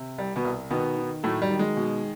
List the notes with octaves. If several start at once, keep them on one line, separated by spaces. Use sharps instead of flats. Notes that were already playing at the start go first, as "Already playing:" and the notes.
Already playing: C3
C2 G3
B2 B3
C2
B2 D#3 B3
D#3
A2 F#3 A3
G3
D#3
G#3
B2